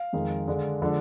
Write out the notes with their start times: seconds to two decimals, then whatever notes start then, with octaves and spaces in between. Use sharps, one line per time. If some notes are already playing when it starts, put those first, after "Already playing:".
Already playing: F5
0.13 F2 D#3 G#3
0.47 D3 G#3 D4
0.82 D3 F3 G#3 D4